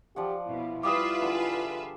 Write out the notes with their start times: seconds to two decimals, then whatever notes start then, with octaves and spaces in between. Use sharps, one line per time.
0.16 F3 G4 D5 F#5
0.47 B2 E4
0.83 G3 F4 B4 E5 F5 D6 D#6
1.22 D3 G#4